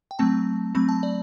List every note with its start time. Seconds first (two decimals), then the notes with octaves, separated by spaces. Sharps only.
0.11 G5
0.19 F#3 A3 C4 A5
0.75 F#3 A3 C4 B5
0.89 A5
1.03 D5